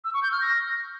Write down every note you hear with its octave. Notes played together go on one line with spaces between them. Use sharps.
E6
C#6
G6
F6
A#6